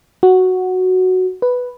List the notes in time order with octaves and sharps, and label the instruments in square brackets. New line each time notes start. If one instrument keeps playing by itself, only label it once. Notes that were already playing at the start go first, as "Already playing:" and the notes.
[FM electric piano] F#4
B4